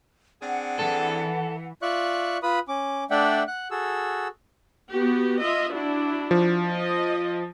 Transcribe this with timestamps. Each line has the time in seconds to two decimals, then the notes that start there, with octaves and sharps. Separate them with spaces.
0.42 C4 D4 G#4 F#5
0.79 E3 A4
1.82 F4 D5 E5 C#6 F#6
2.43 F4 B4 B5 D#6
2.68 C#4 D6
3.11 A3 D4 D5 E5 F#5 G5
3.48 F#5 F#6
3.71 F#4 G#4 A4 E6
4.91 B3 F#4 G4
5.43 F4 D#5 E5
5.73 D4 E4 F#4
6.31 F3
6.68 D#5